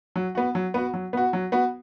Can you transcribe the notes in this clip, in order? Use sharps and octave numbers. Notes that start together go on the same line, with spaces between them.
F#3
B3 F#4
F#3
B3 F#4
F#3
B3 F#4
F#3
B3 F#4